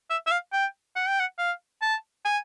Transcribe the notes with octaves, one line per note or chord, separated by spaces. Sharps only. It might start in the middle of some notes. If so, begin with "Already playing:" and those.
E5
E5
F5
G5
F#5
G5
F#5
F5
A5
G#5